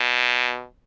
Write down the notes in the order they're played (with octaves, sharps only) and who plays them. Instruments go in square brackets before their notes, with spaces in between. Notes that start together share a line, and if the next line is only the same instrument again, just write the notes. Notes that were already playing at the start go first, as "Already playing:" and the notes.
Already playing: [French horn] B2